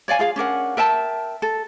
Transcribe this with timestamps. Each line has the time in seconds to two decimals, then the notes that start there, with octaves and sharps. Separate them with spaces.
0.08 C#5 D5 F5 G#5
0.19 F4 G#4 F5
0.36 C#4 D4 A#4 F#5
0.77 A#4 E5 G5 A5
1.42 A4